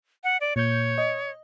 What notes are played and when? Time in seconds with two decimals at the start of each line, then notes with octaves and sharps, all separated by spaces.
0.24 F#5
0.41 D5
0.56 A#2 C#5 G6
0.98 D#5